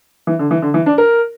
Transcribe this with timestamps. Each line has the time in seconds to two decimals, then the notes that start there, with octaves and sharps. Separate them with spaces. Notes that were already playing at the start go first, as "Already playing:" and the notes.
0.27 E3
0.39 D3
0.51 E3
0.62 D3
0.74 E3
0.86 D4
0.98 A#4